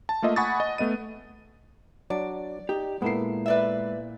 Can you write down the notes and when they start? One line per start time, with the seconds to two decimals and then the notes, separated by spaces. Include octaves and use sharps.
0.09 A5
0.22 A3 A#3 F4 D#5 E5
0.36 F#5 G#5 B5 C#6 D#6 A6
0.60 D#5
0.78 A3 B3 D#5 D#7
2.10 F#3 D4 D5
2.69 D#4 G4
3.02 A#2 G#3 B3 E4 A4 A#4 C7
3.46 B4 D5 E5